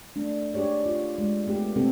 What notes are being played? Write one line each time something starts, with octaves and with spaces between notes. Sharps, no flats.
A3 D4
D4 G4 G#4 C#5 D5
F4
G#3
A3 B3 G4
C3 A3 B3 C4 G4 A4